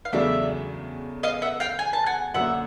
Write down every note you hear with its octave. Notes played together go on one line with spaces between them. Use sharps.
F5
E2 C#3 F#3 A3 D4 D5 E5
D#5 F5
E5 F#5
F5 G5
G#5
A5
F#5 G#5
F#2 D3 F#3 A#3 E5 F#5